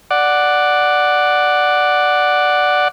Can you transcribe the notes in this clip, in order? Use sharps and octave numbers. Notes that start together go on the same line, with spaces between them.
D5 F#5